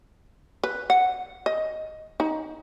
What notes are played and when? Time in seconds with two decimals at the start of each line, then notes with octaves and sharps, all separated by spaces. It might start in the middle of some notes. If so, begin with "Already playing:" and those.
0.63 B4
0.90 F#5
1.46 D#5
2.20 D#4